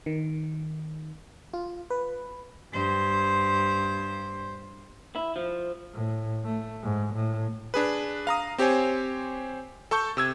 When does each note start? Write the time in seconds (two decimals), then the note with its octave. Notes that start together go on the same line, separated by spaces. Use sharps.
0.06 D#3
1.53 F4
1.90 B4
2.73 G2 C5
5.16 E4
5.36 F3
5.94 A2
6.45 A3
6.82 G#2
7.14 A2
7.74 D4 G#4 B4
8.27 F5 A#5 D#6
8.58 C4 G4 C5 C#5 G#5
9.91 A4 A5 C#6 G6
10.17 C3 E6 G#6